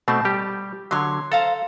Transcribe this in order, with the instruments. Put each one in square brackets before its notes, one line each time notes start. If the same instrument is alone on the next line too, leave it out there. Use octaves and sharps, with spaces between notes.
[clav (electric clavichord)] B2 A3 C4 [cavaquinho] A5
[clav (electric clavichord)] G3 G4
[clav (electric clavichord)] D3 F#3 [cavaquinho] C#5 C6
[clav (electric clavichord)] A4 A5 [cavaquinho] C5 F5 A#5